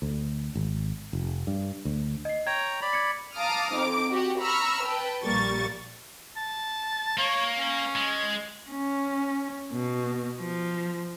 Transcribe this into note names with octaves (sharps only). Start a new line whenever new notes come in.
D2
G#1
F1
G2
D2
D#5 C7
C#5 G5 A#5 G#6
D5 B5
G#6 C#7
F5 A5 A#5 D6 D#6 F6
F2 C4 D#4 D6
F#4 G4 F#5
A#5 B5 C#6 E6 F6
B4 G5 A5
A#1 G3 A#3 C#6 A6
A5
A#3 C#5
C#4
G#3
C#4
B2
F3